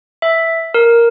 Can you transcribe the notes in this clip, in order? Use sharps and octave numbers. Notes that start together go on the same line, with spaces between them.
E5
A#4